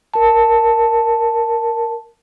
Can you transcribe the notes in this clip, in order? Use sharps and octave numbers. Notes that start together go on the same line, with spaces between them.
A#4 A5